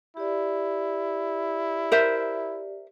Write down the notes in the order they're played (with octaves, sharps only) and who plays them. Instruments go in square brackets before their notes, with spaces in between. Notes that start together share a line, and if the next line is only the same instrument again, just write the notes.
[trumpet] E4 [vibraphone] G4 D5
[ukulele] A#4 C5 E5